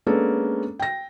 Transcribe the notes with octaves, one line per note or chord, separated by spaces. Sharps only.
G#3 A#3 B3 C#4 D4 A4
G5 A#6